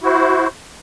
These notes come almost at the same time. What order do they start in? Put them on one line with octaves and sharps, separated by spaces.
E4 F#4 C5